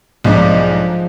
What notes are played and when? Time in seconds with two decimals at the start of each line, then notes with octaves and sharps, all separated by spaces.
0.24 B1 G#2 F3 D4